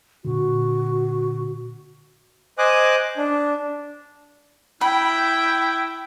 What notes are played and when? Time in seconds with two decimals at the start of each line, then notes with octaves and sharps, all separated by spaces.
0.25 A#2 D3 F#4
2.58 C5 D#5 G#5 D6 D#6 F#6
3.17 D4
4.81 E4 G5 B5